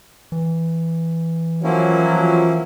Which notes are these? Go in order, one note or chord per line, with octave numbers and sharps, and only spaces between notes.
E3
F3 F#3 A#3 C#4 E4